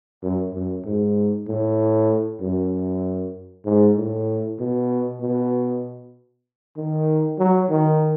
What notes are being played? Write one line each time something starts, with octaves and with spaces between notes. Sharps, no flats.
F#2
F#2
G#2
A2
F#2
G#2
A2
B2
B2
D#3
F#3
D#3